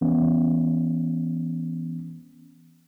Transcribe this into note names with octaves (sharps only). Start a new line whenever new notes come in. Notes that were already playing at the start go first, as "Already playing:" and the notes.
E3 B3 C#4